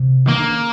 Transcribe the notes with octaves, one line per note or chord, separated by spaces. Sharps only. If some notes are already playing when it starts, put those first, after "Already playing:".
Already playing: C3
D#3 A#3
D3
C#3